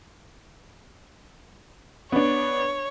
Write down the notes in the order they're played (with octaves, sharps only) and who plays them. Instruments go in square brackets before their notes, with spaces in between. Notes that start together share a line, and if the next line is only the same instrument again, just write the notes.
[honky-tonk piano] B3 D4 [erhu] C#5